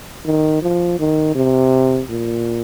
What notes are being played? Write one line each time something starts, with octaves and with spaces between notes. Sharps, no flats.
D#3
F3
D#3
C3
A#2